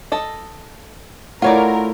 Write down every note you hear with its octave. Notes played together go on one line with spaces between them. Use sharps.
A4 D#5
A3 E4 F4 A#4 C#5 D5 F#5